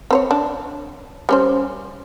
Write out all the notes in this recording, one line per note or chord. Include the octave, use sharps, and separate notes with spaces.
C4 C5 C#5
D4
G3 C#4 C5